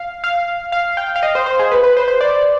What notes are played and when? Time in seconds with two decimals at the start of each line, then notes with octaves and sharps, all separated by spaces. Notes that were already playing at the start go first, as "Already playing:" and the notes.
Already playing: F5
0.24 F5
0.72 F5
0.97 G5
1.16 F5
1.23 D#5
1.35 C5
1.46 C5
1.59 G#4
1.71 B4
1.83 B4
1.97 C5
2.08 C5
2.21 D5